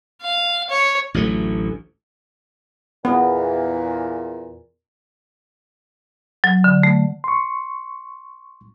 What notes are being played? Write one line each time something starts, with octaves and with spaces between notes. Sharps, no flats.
F5
C#5
A1 D2 F#3 A3
E2 A#2 B3
F#3
D3
A3
C6 C#6